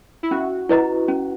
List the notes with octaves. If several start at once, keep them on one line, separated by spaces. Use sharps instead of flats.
E4
C#4 F#4
E4 B4 D#5 A#5
C#4